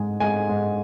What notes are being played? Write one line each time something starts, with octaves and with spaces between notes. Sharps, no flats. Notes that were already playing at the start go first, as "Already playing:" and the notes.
Already playing: G#2 G#3 G#5
G#2 G#5
G#2